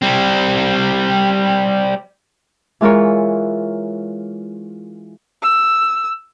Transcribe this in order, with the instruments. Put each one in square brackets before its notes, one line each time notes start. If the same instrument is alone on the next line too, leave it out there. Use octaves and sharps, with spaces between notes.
[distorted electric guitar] G3 C4
[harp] E3 G#3 F4 A#4 C#5
[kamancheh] E6